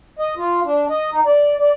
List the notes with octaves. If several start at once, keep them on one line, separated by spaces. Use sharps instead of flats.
D#5
F4
D4
D#5
D#4
D5
D5